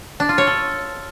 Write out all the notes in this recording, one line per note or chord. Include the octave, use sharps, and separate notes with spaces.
D4
F4
C#5
A4